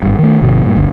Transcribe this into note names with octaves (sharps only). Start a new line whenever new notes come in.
G#1 G2
D#3 A3
G1 B2 D3 F3
G2 A#2
G1 D2